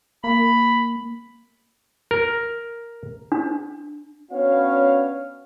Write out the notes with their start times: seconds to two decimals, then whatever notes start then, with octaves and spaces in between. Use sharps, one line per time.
0.24 A#3 B5
2.11 A#4
3.32 D4
4.32 B3 C#4 D4 F#4 C#5 F5